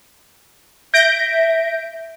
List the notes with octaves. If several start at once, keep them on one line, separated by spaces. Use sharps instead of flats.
E5 G6 A#6 D7